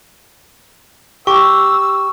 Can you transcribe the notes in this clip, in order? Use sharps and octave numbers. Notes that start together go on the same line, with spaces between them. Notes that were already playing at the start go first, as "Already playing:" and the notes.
G4 C#6 E6